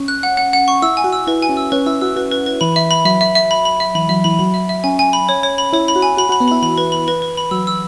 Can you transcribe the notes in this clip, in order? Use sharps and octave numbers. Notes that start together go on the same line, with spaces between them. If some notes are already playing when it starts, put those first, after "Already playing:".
Already playing: C#4
F#6
F#5
F#5
F#5
C#6
E4 E6
G#5
F#4
E6
E4 B4
G#5
C#4
E6
C#4 B4
E4 E6
F#4 E6
F#4 B4
B4
B4
E3 B5
E5
B5
F#3 E5
E5
E5
B5
B5
E5
E3 B5
F#3 E5
E3 B5
F#3 B5
E5
E5
C#4 G#5
G#5
B5
C#5
C#5
B5
E4 C#5
B5
F#4
G#5
F#4 B5
F#4 B5
B3
E4 B5
E3 B5
B4
B5
B4
B4
B5
F#3 E6
E6